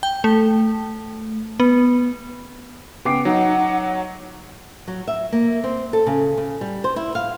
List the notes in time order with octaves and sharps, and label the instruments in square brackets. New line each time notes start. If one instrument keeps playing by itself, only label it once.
[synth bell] G5
A3
B3
[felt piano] C#3 D6 C7 [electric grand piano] B3 [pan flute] G5
[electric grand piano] F#3 [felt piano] D#4 D#5 [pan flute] F#5
[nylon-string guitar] F#3
E5
A#3
C4
A4
C#3
C#3
G3
C5
E4
F5